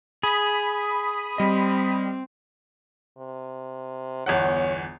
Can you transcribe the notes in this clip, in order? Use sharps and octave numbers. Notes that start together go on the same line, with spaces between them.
G#4 B5 D#6 B6
G3 C4 D#5
C3
G1 E2 C#5 F#5